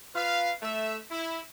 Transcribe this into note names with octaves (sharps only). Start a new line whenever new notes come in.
F4 B4 F5
A3 E5
E4